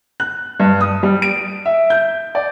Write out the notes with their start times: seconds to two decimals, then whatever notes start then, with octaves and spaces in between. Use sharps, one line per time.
0.20 F#6
0.60 G2
0.81 D#6
1.03 G3
1.22 D7
1.66 E5
1.90 G6
2.35 D5